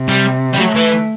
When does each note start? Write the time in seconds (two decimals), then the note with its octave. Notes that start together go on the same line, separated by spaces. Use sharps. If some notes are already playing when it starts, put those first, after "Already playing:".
Already playing: C3
0.09 G3
0.54 G3
0.58 F#3 A3
0.76 E3